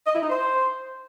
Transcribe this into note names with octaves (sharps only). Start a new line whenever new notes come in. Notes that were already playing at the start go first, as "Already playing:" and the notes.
D#5
E4
D#4
C5